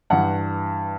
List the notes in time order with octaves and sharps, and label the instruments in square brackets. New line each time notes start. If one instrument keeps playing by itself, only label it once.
[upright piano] G2 E3 F#5